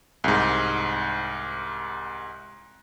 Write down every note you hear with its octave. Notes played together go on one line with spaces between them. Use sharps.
C2 G#2